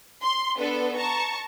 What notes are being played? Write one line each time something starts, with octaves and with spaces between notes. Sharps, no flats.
C6
B3 D4 A4 B4
A5 A#5 C#6